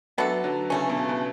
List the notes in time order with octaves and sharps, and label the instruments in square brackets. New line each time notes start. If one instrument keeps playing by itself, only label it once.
[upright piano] F#3 A3 [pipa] B3 D4 F#4 A4
[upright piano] D3 F#3
[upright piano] C#3 [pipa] E3 A3 C#4
[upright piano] B2
C#3
B2